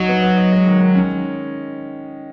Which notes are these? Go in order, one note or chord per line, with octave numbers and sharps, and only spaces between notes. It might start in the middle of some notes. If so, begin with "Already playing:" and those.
Already playing: F#3 D#4 F#4
B3
B3
D#5
G#3
D#3
D#3
C#4